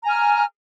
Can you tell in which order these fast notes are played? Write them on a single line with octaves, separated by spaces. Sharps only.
A#5 G#5 F6